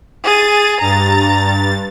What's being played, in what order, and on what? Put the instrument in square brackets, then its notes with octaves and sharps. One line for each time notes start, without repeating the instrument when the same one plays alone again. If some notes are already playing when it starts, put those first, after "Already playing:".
[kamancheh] G#4 [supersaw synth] A6 D#7
[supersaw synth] G2 A6 [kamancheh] A#5